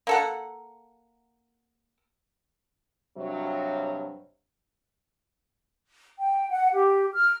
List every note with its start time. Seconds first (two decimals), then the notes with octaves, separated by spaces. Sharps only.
0.07 A#3 A4 F#5
3.17 G2 C3 F#3
6.19 G5
6.49 F#5
6.73 G4
7.13 F6